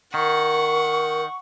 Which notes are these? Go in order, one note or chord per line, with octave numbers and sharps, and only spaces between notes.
D#3 A#4 F#5 C#6